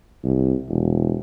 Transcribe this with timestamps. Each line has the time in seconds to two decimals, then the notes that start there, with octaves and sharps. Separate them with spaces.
0.24 C2
0.69 E1